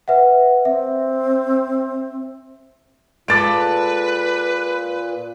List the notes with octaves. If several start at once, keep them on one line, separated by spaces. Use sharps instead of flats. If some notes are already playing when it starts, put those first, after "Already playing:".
B4 E5 F#5
C4 E5
A#2 G#3 A4 B4 D6 A6 D7